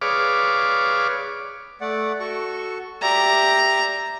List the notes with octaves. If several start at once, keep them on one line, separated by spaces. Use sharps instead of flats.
G#4 B4 C#5 D5 F5 D6
A3 D5 F#5
F#4 A4 C#6
G4 D5 E5 A#5